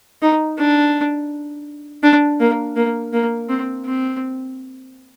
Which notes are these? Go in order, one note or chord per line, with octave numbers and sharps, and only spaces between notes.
D#4
D4
D4
A#3
A#3
A#3
C4
C4